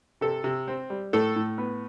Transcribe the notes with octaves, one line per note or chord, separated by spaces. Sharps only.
C3 A4
C3
C4
G3
A2 A4
A2
B3